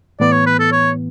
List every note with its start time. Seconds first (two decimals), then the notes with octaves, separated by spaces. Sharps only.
0.20 A2 E3 B3 D5
0.32 C#5
0.46 B4
0.60 A4
0.72 C#5